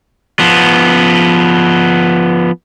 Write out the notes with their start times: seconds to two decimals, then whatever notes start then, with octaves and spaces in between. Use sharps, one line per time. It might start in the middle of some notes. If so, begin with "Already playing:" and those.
0.40 F3 B3